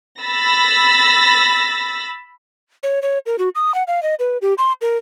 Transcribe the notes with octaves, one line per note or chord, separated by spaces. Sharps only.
B5 E6 A6 A#6
C#5
C#5
A#4
F#4
D#6
F#5
F5
D#5
B4
G4
C6
A#4